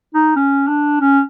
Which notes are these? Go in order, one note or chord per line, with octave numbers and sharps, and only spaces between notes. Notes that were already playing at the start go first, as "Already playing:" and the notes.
D#4
C#4
D4
C#4